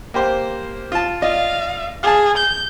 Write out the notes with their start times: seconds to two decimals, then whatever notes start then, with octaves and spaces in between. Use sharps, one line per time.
0.14 A#3 G4 C5
0.92 F4 A5
1.22 F4 D5 D#5 F5
2.03 G#4 F5 A5
2.37 G6